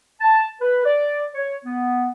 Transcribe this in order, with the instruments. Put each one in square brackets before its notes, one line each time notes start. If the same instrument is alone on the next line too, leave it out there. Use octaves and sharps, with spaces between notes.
[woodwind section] A5
B4
D5
C#5
B3